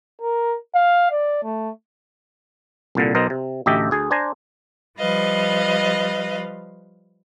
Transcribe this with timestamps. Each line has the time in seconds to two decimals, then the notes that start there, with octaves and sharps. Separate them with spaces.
0.22 A#4
0.75 F5
1.12 D5
1.44 A3
2.95 C2 A#2 D3
3.15 B1 B2 A#4 C5 D#5
3.30 C3
3.66 A1 D2 G4 D#5 E5
3.91 D2 G#4
4.11 D4 C5 G#5 A#5
4.98 F3 G3 B4 D#5 F5